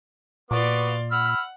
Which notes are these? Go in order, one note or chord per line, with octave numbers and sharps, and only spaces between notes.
A#2 B3 F#4 D5 F5 C6 D6
F#5 B5 E6 F6